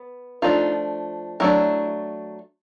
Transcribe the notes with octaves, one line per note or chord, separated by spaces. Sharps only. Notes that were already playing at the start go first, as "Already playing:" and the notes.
Already playing: B3
F3 A3 D4 D#4 F4
F#3 A3 D4 E4